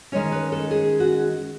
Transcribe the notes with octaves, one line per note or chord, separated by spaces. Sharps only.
D#3 G#3 C#4 C#5
B4
A4
G#4
F#4